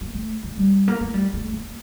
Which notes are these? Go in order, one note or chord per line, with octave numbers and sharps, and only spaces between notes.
A#3
A3
A3
G3
A#3
A3
G3
A3
A#3